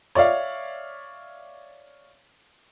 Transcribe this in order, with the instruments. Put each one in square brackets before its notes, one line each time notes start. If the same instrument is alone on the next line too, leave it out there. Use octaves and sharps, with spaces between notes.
[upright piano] C#5 D5 E5 F5